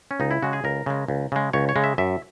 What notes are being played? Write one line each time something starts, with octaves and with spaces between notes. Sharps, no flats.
C#4
C#2 D#4
E4
C#3 G#3 F#4
G#4
C#2 A#4
C#3 G#3
C#2
C#3 G#3
C#2 C#5
C#5
C#3 G#3
E5
F#2 E5